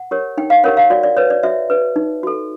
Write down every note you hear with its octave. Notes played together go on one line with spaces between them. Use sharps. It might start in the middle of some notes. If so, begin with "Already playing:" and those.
Already playing: F#5
G4 A#4 C#5
D#4 G5
F5
G4 A#4 C#5 F#5
F5
F#4 D5
D5
B4 C#5
D5
F#4 E5
B4
D#4
F#4 A4